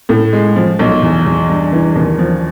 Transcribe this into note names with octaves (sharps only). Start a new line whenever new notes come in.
A2
G#3
F3
B1
E2
E2
G2
E3
D#2
F3